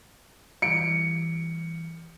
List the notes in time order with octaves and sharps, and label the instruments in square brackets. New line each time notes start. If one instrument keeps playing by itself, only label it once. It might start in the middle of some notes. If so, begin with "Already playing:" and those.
[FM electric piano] E3 G3 [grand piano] C#7 D7